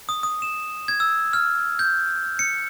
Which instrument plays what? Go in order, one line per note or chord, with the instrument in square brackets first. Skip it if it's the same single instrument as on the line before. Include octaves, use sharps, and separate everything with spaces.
[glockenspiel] D#6
D#6
E7
G#6
E6
F6
G6
C#7